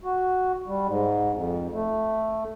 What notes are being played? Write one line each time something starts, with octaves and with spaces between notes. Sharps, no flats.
F#4
G3
G#2
F2
A3